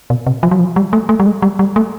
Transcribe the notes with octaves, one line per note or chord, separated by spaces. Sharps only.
B2
C3
F3
F#3
F3
G3
A3
A3
G3
G#3
G3
G3
A3